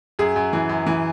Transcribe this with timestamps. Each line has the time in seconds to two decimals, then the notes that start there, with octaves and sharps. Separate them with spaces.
0.19 F#2 G#4
0.36 F#2
0.53 E3
0.69 F#2
0.87 E3